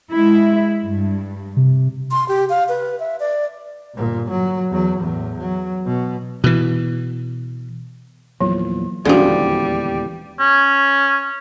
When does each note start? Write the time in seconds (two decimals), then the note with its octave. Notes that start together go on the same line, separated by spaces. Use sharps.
0.11 G#3 E4
0.82 G2
1.57 C3
2.11 C6
2.28 G4
2.49 F5
2.69 B4
3.00 E5
3.20 D5
3.95 G1 A#2
4.31 F#3
4.71 E2 F#3
5.00 E2 A2
5.38 F#3
5.86 B2
6.44 B2 E3
8.41 E2 A#2 F3 F#3
9.05 D#1 E2 D3 F3 G3 G#3 C#4 F#4
10.40 C#4